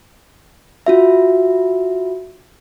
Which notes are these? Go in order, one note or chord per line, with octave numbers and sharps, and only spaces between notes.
F4 F#4 E5